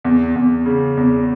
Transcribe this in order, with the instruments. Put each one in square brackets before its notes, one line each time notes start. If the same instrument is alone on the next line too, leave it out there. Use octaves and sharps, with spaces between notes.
[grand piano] E2
E2
C#3
E2